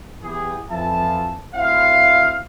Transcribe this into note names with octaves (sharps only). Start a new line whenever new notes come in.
E3 B3 G4 G#4
F2 E3 F3 E5 A5
D2 C4 E4 E5 F5